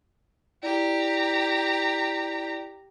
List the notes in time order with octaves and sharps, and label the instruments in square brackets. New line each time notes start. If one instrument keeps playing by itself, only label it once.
[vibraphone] E4 D5 [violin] G4 A#5